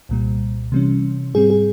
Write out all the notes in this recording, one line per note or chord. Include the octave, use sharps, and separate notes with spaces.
C2 A#2 G3
C3 E3 G3 C#4
G#2 G3 C4 G#4
G#4